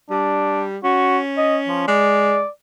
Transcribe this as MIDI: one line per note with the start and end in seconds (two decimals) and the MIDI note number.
0.10 0.77 55
0.10 0.64 62
0.84 1.87 61
0.84 1.19 66
1.37 1.58 75
1.67 1.86 53
1.88 2.42 56
1.88 2.48 74